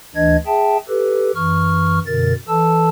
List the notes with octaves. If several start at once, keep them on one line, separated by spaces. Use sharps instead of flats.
D2 E3 D4 D#5 G#6
G#4 E5 G5 A5
G4 A4 B4
F#2 E3 C#6 F6
F#2 B2 D3 A#4 A6
E3 A4 A5 E6